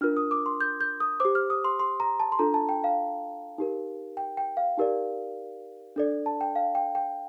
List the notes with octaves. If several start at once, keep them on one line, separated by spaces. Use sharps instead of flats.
D4 F4 A#4 F6
D#6
D6
C6
G6
G6
D#6
G4 C5 D6
F6
D#6
C6
C6
A#5
A5
C6
D4 F4 A4 A#5
A5
G5
F5
D#4 G4 A#4
G5
G5
F5
D#4 G4 A#4 D5
D4 A4 D5
A5
G5
F5
G5
G5